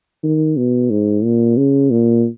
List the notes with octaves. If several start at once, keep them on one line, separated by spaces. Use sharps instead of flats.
D#3
B2
G#2
A#2
C#3
A#2